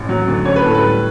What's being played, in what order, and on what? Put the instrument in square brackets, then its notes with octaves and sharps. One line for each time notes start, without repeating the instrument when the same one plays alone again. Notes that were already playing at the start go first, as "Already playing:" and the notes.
Already playing: [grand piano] A1
F#3
D2
C#4 C#5
B4
A2 A4
B4
G3